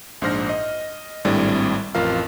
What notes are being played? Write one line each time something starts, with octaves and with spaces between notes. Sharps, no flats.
A#1 G#2 D4 C5 F6 A#6
D#5
G#1 A2 G3 C4 D4 D5
A1 F2 F4 A#4 F5